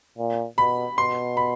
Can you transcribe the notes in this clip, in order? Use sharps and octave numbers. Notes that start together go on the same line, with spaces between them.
A#2
B2 B5
B2 C6
B5